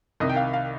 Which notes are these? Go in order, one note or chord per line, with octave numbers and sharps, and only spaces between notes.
C2 C3 D#3 D#5
G5
F5
F5